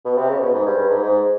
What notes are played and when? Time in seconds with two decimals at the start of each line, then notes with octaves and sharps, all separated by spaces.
0.05 B2
0.17 C3
0.29 C#3
0.41 B2
0.54 G#2
0.66 G2
0.78 G2
0.90 G#2
1.02 G#2